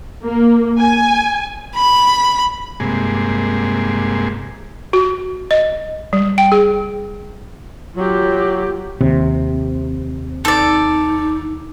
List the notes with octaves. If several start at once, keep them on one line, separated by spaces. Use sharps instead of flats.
A#3
G#5
B5
G2 C3 G#3 A#3 G#4
F#4
D#5
G3
G5
G#4
F#3 F4 G4
D#2 C3
D#4 A4 D5